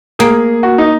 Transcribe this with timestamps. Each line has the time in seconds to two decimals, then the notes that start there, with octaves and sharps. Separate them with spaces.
0.19 A#3 G#4
0.63 F#4
0.78 D#4